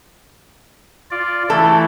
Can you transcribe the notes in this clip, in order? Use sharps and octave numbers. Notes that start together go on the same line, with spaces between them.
F4 D5
E3 A3 E4 A4